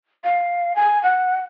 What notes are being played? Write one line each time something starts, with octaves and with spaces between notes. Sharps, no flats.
F5
G#5
F#5